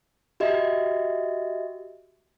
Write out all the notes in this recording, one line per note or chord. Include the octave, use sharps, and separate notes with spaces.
F#4 G4 D#5 E5